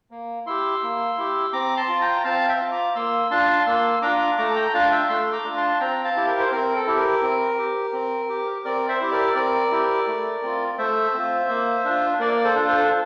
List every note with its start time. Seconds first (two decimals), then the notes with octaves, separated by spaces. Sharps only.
0.11 A#3
0.46 E4 G4 C6 E6
0.83 A#3
1.18 E4 G4
1.53 C4 A#5 D6
1.77 A5 C6
1.89 F4
2.01 G5 A#5
2.24 C4 F5 A5
2.49 E5 G5
2.61 F4
2.72 A#5 D6
2.95 A#3 C6 E6
3.31 D4 F4 A5 C6
3.67 A#3 C6 E6
4.02 D4 F4 A#5 D6
4.38 A3 A#5 D6
4.56 G5 A#5
4.69 G5
4.73 D4 F4 F5 A5
4.92 E5 G5
5.09 A3 C6 E6
5.27 E6
5.32 A#5 D6
5.44 D4 F4
5.57 A5 C6
5.80 C4 G5 A#5
6.04 F5 A5
6.16 E4 G4
6.27 A#4
6.40 C5
6.52 C4 A#4
6.75 A4
6.87 E4 G4
6.98 A#4
7.22 C4
7.58 G4
7.93 C4
8.29 G4
8.65 C4 A#4 D5
8.88 C5 E5
9.01 E4 G4
9.12 A#4 D5
9.35 C4 A#4 D5
9.71 E4 G4
10.07 A3
10.43 C4 F4
10.78 A3 C5 E5
11.13 C4 F4
11.49 A#3
11.85 D4 F4
12.20 A#3 A#4 D5
12.44 A4 C5
12.55 D4 F4
12.68 A4 C5